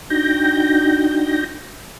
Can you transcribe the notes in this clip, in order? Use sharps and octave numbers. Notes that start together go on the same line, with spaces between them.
D4 D#4 F#4 G5 G6 A#6